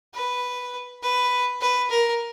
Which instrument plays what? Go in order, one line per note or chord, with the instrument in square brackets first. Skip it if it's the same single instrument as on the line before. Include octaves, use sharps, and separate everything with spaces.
[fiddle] B4
B4
B4
A#4